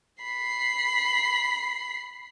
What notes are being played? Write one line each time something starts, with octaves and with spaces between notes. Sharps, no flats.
B5 C7